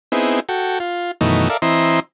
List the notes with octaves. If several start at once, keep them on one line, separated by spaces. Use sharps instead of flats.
B3 C4 D#4 E4 G#4
F#4 A4 G5
F4
F#2 B2 D#3 E3 A3 D#4
A4 A#4 D5 E5 F5
E3 C4 E4 D#5 A#5 C6